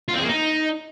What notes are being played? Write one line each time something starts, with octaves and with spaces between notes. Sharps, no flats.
F4
C4
G#4
A#3
D#4